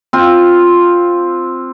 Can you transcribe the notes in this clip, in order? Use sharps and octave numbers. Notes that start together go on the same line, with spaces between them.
C4 F4